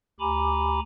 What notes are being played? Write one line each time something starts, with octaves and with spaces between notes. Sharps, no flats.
D2 G4 G#5 A#5 B5 D6